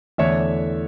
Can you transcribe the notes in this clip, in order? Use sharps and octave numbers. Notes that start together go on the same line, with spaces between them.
E2 D3 A3 D4 C#5 E5